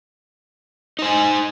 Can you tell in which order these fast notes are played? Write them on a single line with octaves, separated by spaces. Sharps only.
D#4 C5 G#5